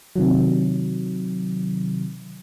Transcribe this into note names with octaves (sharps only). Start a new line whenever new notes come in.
C3 D#3 F#3